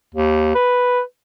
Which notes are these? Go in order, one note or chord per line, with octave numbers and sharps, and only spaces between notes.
D#2
B4